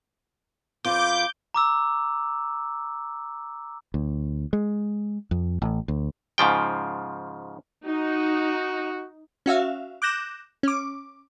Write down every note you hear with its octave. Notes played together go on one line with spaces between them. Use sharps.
F2 F4 B4 D6 G6
A#5 D6 E6
D2
G#3
F2
A1
D2
G#2 C#3 F3 G5
D#4 F#4
C#4 F#4 E5 F5
D6 F#6 G6 A#6 E7
C#4 D6